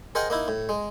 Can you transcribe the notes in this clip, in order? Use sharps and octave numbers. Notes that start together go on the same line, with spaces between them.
G#4 A#4 C5 D#5 F#5 G5
A#3 D#4 E4
A2
G#3